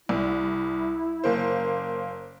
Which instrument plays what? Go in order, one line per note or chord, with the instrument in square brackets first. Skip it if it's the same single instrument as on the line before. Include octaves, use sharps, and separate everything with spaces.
[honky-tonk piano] C2 [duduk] E4
[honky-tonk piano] F#1 A#3 C5